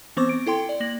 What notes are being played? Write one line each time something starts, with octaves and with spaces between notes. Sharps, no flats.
E3 B3 C4 C5 C#6 D6
D7
E4 A4 G5 C6
D5
A#3 A#6 F#7